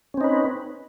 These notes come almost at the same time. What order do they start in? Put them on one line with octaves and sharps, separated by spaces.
C#4 C4 D#4 B4